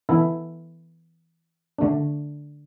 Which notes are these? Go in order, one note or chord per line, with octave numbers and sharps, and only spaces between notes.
E3 B3 E4 A4
D3 A3 D4